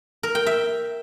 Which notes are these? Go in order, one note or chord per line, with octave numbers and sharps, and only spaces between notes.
A#4
G5
E5